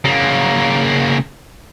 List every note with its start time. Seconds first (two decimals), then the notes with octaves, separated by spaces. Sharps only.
0.05 C#3 A#3